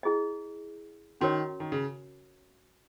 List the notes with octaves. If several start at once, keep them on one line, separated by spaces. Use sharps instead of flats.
E4 G#4 D#5
D#3 C#4 F#4 A#4 C#5
D#3
C#3